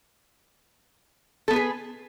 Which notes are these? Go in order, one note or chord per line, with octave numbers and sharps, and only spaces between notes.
B3 G#4 A4 B4